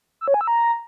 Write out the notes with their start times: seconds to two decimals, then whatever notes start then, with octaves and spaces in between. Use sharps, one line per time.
0.21 E6
0.28 C#5
0.34 G#5
0.41 E6
0.47 A#5